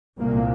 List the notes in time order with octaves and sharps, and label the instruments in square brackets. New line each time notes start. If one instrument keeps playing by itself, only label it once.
[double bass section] C2 A#2 A#3